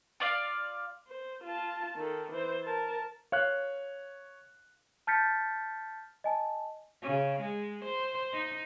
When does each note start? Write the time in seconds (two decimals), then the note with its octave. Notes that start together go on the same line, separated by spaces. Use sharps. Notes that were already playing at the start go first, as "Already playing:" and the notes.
0.20 F4 D5 F5
1.07 C5
1.44 F4 A5
1.96 D#3 A4
2.31 E3 C5
2.64 A#4 A5
3.32 C#5 F5 F#6
5.07 A5 F6 G6 A6 B6 C#7
6.24 D#5 G#5 A5
7.02 C#3
7.41 G#3
7.85 C5
8.33 D#4